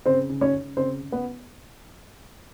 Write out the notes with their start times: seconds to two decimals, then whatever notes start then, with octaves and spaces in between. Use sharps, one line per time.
0.06 C#3 C4 C5
0.29 C#3
0.41 C#4 C#5
0.54 C#3
0.77 C#3 C4 C5
1.01 C#3
1.12 B3 B4